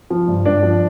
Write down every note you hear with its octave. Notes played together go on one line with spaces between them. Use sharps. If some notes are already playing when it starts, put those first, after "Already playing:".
F3
G2
G2 D4 D5
F3